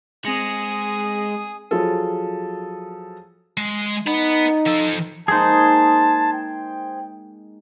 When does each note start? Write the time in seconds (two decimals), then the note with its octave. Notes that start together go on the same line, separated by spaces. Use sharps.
0.25 G#3 C4 G#4 D#6 A#6 C#7
1.71 F3 F#3 F4 G#4 A4
3.57 G#3
4.07 B3 D#4 B5
4.66 F3 A4
5.28 G#3 A#3 D#4 G#4 C5 A5
6.33 G5